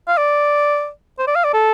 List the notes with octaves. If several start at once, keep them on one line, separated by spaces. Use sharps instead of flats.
F5
D5
C5
D5
F5
D5
A4